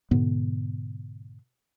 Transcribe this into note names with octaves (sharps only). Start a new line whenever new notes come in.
G#2 B2 D3 B3